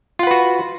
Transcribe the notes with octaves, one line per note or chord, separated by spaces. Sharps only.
F4 F#4 B4 F#5